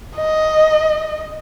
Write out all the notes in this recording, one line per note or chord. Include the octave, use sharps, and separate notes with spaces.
D#5